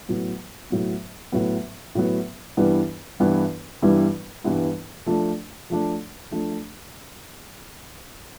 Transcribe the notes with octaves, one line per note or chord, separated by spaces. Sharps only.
A2 F#3 B3
A2 F#3 B3
A2 F#3 B3
A2 F#3 B3
G2 E3 G3 B3 E4
G2 E3 G3 B3 E4
G2 E3 G3 B3 E4
G2 E3 G3 B3 E4
F3 A3 D4
F3 A3 D4
F3 A3 D4